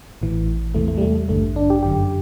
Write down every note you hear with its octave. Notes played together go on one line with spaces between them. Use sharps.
A1 A2 E3
E2 C3 E3 A3
A3
G3
A3
G3
A1 G2 D3 A3
D4
G4
G1 F#2 D3 G4